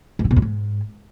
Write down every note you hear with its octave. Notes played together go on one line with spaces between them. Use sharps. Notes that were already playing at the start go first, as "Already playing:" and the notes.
G#2
D3
B2
F#2
G#2